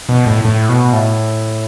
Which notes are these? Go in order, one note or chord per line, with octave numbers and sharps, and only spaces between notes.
B2
A2
A2
B2
A2